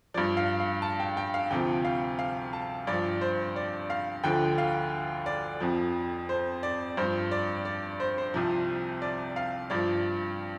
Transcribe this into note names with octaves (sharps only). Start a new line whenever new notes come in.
G2 F3 D5
F5
F5
A5
G5
G5
F5
D2 C3 F3 G5
F5
F5
A5
G2 F3 D5
C5
D5
F5
D2 D3 F3 G5
F5
D5
F2 F3
C5
D5
G2 F3 C5
D5
D5
C5
C5
C2 C3 F3
D5
F5
G2 F3 D5